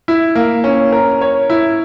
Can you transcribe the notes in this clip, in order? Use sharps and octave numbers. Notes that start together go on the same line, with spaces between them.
E4
A#3
C#4
A#4
C#5
E4